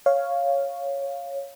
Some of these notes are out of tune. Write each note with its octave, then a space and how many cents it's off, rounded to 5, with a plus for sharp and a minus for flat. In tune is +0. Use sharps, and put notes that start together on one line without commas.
C#5 +0 F5 +0